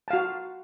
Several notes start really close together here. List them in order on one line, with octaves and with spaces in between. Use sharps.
A5 F5 F#4